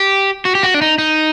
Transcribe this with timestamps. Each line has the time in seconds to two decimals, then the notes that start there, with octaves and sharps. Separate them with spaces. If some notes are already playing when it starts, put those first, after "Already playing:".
Already playing: G4
0.45 F#4
0.55 G4
0.63 F#4
0.74 D4
0.81 D#4
0.98 D#4